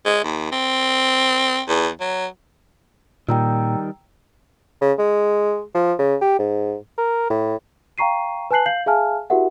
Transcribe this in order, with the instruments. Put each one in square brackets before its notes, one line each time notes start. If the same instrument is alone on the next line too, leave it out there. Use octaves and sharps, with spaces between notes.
[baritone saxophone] G#3
D#2
C4
E2
F#3
[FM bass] A#2 [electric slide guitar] D#3 G3 [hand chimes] G5 A#5 E6
[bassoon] C#3
G#3
F3
C#3
G4
G#2
A#4
A2
[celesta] F5 G5 A#5 C#6 C7 D#7
B4 G#5 A5 F#6 C7 F#7
F5 G6 C7 F#7
G#4 E5 F5 G#5 A5 F6
E4 F#4 G4 A#4 E5 F#5